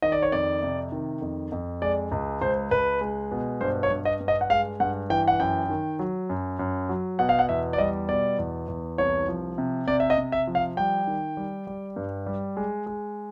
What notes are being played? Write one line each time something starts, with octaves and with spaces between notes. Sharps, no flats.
D#3 D#5
D5
C#5
F2 D5
C3
D#3
F2
F2
G#3 D5
C#2
C#2 C5
C#2 B4
G#3
B2
G2 C5
C#5
G2
D#5
G2
D#5
F#5
G#3 F5
G2 F#5
E3 G5
F#5
F#2 G5
D#3
F#3
F#2
F#2
F#3
B2 F#5
F5
F#5
E2 E5
D5
G3 D#5
B2 D5
E2
E2
C2 C#5
F3
C3
C3 D5
E5
D#5
C3
E5
F3
F5
G3 G5
D#3
G3
G3
G2
G3
G#3
G#3